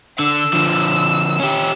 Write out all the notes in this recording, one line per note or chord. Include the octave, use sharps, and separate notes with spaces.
D3 E6
D3 F3
C#4 G4